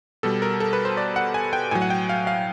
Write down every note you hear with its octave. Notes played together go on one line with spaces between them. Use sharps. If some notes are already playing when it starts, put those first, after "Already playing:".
B2 G3 A4
A#4
A4
B4
C5
D5
F#5
G#5
G5
A2 F#3 G#5
F#5
G5
F5
F5